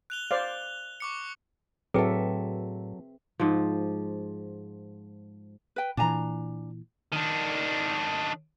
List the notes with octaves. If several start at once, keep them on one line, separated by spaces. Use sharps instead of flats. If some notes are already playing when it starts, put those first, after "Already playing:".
F#6 F7 G7
C5 D5 F5
C#6 D6 C#7
A2 F#3 C4 G#4 A4 B4 E5 G5
G#2 F3
B4 G5
A#2 E3 D4 G#5 A#5
D#3 D4